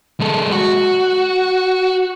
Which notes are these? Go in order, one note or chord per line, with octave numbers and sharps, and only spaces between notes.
G#3 A4
F#4